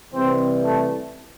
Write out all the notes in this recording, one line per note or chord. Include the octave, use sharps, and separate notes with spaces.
C3 E3 G3 C4
A3